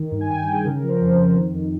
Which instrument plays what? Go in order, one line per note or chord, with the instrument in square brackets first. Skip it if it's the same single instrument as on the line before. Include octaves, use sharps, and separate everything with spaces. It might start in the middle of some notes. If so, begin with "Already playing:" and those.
Already playing: [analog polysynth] D#3
G2
G#5
G2 G5
D#3
G#4
C#3 A#4
A#4
F3
C5
F2
F2
D#3
F2